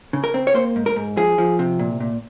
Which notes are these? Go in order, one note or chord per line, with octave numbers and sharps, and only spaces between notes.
C#3
A#4
C4
C#5
A#3 C5
G#2
A#4
G#2
F3 G#4
F3
C3
A#2
A#2